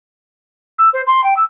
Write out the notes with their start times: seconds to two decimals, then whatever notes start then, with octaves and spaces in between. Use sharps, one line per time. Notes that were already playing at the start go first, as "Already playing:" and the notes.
0.78 E6
0.93 C5
1.06 C6
1.23 G5
1.36 E6